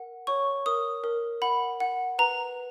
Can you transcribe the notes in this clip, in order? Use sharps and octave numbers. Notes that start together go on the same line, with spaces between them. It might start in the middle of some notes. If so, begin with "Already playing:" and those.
Already playing: A#4 F#5
C#5 C#6
A#4 D#6
A#4
F#5 B5
F#5
B4 A#5